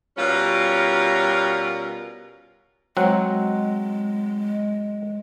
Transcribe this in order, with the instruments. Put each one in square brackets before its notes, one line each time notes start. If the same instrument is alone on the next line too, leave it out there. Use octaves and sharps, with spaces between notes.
[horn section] B2 G3 C#4 F4 A#4
[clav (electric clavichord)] F#3 C4 F#5 [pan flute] G#3